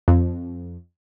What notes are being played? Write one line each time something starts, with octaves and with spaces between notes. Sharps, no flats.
F2